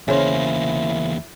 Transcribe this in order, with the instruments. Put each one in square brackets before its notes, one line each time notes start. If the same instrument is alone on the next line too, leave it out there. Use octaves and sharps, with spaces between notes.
[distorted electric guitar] E2 A#3 [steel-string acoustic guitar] C#3 C5 [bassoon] E4 [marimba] C#5